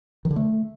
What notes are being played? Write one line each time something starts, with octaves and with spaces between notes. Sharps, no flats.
D#3
D3
A3